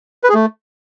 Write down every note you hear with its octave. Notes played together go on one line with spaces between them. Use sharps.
B4
G#4
A3